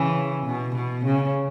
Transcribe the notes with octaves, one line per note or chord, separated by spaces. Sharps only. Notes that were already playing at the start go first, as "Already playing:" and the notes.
Already playing: C#3 E3
B2
B2
C#3